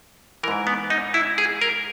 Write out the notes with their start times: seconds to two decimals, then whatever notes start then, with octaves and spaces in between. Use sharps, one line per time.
0.43 E3 A#4
0.48 G#2
0.67 B3
0.90 D#4
1.14 E4
1.38 G#4
1.61 A#4